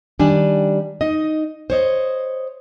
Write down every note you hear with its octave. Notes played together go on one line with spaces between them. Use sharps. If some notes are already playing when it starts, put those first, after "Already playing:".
D#3 G3 D4 G#5
D#4 D#5
C5 C#5 D#5